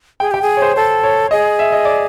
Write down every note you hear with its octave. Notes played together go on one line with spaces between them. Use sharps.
G#4 G5
G4 G5
G#4
C#5
C5
A4 C5
C#5
G#4 D#5
E5
D#5
D5